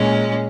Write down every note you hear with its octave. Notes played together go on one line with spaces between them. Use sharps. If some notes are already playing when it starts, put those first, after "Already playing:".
Already playing: A#2 G#3 C#4